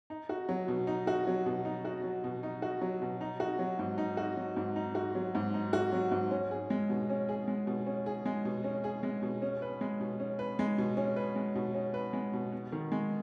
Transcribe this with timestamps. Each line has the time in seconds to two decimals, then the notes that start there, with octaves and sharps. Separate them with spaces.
0.10 D#4
0.29 F#4
0.49 F#3
0.68 B2
0.87 D#4
1.07 F#4
1.27 F#3
1.46 B2
1.65 D#4
1.85 F#4
2.04 F#3
2.24 B2
2.43 D#4
2.62 F#4
2.81 F#3
3.02 B2
3.21 D#4
3.40 F#4
3.59 F#3
3.79 G#2
3.98 D#4
4.17 F#4
4.37 F#3
4.56 G#2
4.76 D#4
4.95 F#4
5.15 F#3
5.35 G#2
5.54 D#4
5.73 F#4
5.92 F#3
6.11 G#2
6.31 C#4
6.51 G#4
6.70 G#3
6.90 B2
7.10 C#4
7.29 G#4
7.48 G#3
7.67 B2
7.87 C#4
8.06 G#4
8.26 G#3
8.45 B2
8.64 C#4
8.84 G#4
9.03 G#3
9.22 B2
9.42 C#4
9.62 B4
9.81 G#3
10.01 B2
10.20 C#4
10.39 B4
10.59 G#3
10.78 B2
10.97 C#4
11.16 B4
11.36 G#3
11.56 B2
11.74 C#4
11.94 B4
12.13 G#3
12.34 B2
12.52 B3
12.72 D#3
12.92 G#3